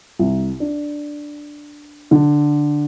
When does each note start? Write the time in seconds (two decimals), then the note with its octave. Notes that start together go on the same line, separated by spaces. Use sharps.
0.19 C2
0.60 D4
2.11 D3